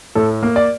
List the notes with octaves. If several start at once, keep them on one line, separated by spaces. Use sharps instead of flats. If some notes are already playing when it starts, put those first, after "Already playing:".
A2 A4
A#3
D5